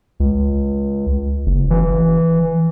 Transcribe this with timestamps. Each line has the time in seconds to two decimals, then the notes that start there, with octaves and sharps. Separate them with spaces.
0.20 C#2
1.46 F#1
1.70 E3